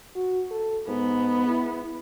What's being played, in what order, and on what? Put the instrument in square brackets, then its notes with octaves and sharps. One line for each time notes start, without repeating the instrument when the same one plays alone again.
[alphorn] F#4
A4
[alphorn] G#2 [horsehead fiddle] B3
[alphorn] E4